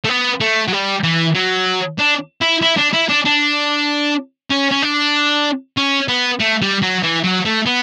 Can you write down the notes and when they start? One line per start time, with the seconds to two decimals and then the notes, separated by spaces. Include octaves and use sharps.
0.05 A3
0.09 B3
0.41 A3
0.68 F#3
0.73 G3
1.04 E3
1.35 F#3
1.99 D4
2.41 E4
2.62 E4
2.77 D4
2.93 E4
3.09 D4
3.25 D4
4.50 C#4
4.71 C#4
4.82 D4
5.77 C#4
6.08 B3
6.40 A3
6.62 G3
6.82 F#3
7.03 E3
7.24 F#3
7.45 A3
7.66 B3